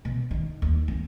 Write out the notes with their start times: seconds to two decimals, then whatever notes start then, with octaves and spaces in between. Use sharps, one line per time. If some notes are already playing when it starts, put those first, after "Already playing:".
0.05 B2
0.31 D#3
0.62 D#2
0.88 C4